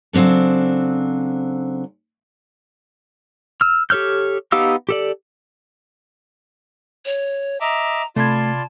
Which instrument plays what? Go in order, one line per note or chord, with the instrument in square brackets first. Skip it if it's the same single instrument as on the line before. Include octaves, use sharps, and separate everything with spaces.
[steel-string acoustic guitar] C#3 F#3 C4 D4 A4
[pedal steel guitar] E6 F6
G4 A4 C#5 F6 G6
B3 D#4 G4 F5 E6
G4 A4 D5
[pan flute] C#5
[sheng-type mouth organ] D#5 E5 D6 [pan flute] A#5
[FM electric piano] C3 B5 G#6 [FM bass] A3 [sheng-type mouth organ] F4 D5 C6 [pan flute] A5